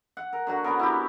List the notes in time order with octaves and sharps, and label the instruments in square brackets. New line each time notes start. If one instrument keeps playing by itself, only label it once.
[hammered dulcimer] F#5
A#4
D3 F#3 F#4
[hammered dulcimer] B3 C#4 [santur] A#4
[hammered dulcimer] C#4 [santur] E4 G4